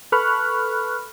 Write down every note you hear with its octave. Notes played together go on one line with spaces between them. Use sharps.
A4 B4 B5 C#6 F6 F#6